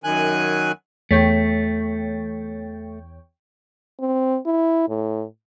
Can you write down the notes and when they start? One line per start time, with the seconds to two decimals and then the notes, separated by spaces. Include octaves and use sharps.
0.04 F#2 D#3 G#5 F#6
1.11 E2 A3 C#5 G5
4.00 C4
4.46 E4
4.89 A2